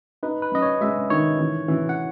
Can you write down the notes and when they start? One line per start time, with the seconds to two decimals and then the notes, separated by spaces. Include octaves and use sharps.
0.23 D#4 B4
0.42 B4
0.52 F#2 D#5
0.62 C#5
0.81 G#3 E5
1.10 D#3 C#5
1.39 E3
1.68 E3
1.89 F#5